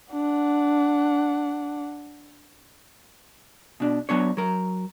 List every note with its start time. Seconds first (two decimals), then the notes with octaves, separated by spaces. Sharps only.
0.13 D4 F#5
3.80 B2 D4
4.09 F#3 B3 D4 C#5
4.37 F#3 A#4